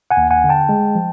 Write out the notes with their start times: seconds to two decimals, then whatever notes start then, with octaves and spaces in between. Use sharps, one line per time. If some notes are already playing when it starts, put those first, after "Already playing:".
0.11 F#5 G#5
0.17 D#2
0.31 F#5 G#5
0.44 D3
0.49 G5 A5
0.69 G#3
0.95 F3